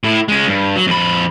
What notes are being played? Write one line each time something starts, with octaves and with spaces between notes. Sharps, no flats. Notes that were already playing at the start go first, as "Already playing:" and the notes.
A2 E4
G#3 C#4
G2
F#3
F2 B5